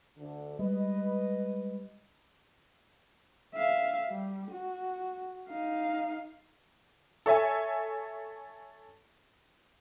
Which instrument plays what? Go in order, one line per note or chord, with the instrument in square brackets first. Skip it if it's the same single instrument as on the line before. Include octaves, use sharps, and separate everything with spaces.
[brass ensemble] D2 D3
[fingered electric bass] G3 G#3 [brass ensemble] B4 D#5
[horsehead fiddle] E5 F5
G3
F#4
D#4 F5
[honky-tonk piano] A4 C#5 E5 G#5